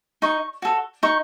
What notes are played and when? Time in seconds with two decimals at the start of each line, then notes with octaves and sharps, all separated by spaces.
0.22 D#4 C#6
0.62 F#4 A4
1.03 D#4 C#6